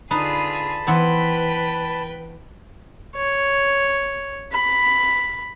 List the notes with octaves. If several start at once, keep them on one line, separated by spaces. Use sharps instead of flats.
D3 D#4 F4 G#4 B4 A5 B5
E3 B3 B4 C5 G5
C#5
B5